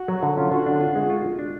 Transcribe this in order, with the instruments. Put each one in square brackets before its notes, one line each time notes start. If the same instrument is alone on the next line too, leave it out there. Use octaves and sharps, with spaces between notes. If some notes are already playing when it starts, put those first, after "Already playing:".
Already playing: [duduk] F#4
[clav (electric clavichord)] F#3
D3
[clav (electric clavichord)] C#4 [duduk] F4
[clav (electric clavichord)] D3 [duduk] F#4
[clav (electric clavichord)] D4
F4
G#3
F4
F4
D4